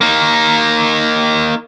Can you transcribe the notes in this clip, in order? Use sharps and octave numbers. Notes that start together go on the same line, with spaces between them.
A#3 D#4